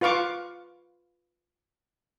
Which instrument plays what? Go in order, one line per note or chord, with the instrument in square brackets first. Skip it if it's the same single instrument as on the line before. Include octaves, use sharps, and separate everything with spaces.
[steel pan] F4 B4 F5 C#6 D6